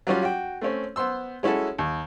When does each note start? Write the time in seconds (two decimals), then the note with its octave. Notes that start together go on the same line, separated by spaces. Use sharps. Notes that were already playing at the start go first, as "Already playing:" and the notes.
0.07 F#3 G3 C#4 F4
0.23 F#4 G5
0.62 A3 C4 C#4
0.96 B3 C5 C6 E6
1.43 G#3 C#4 E4 F#4 A4
1.78 D#2